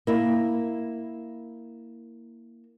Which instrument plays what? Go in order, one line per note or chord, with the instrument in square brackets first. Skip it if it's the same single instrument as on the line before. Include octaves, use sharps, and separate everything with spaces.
[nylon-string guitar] A#3 E4